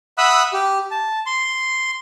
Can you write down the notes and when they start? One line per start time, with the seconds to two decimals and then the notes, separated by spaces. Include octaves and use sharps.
0.18 E5 F#5 B5 D#6 E6 F#6
0.53 G4
0.91 A5
1.26 C6